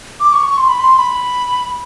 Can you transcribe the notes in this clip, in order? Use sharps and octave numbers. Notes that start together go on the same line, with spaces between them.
D6
C#6
C#6
C6
B5
C6
B5